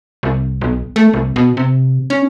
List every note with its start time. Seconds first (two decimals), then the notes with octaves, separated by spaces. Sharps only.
0.23 C2
0.61 B1
0.96 A3
1.14 C2
1.36 B2
1.57 C3
2.10 C#4